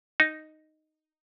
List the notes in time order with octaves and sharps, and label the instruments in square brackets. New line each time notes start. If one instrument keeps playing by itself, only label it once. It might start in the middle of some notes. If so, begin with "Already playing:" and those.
[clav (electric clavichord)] D#4